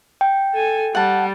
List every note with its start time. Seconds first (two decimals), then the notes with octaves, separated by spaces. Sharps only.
0.21 G5
0.54 A4 G#5
0.95 G3 F#5 A5